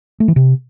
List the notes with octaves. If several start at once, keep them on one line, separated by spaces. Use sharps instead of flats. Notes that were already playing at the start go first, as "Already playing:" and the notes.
A3
E3
C3